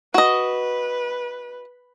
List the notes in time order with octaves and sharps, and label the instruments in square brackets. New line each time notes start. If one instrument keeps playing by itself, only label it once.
[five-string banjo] F#4 D#5 [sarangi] B4